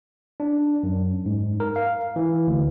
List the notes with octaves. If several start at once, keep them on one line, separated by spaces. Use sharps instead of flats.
D4
F#2
G#2
A#4
F5
E3
D2